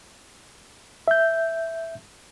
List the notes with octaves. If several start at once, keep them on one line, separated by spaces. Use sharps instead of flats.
E5 G6